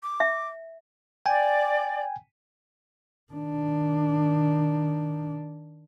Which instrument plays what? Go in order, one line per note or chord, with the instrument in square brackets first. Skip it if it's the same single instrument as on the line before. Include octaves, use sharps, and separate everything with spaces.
[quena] D6
[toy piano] E5
[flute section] D5 [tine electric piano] G5 G#5
[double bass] D#3 D4